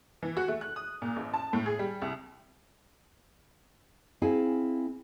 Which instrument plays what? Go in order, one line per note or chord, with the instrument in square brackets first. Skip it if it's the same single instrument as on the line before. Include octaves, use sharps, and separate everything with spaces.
[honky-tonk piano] E3
F#4
A3
F#6
D#6
A#2
A1
A5
A2
G#4
G3
C2
[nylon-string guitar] C4 E4 G#4 F5 G#5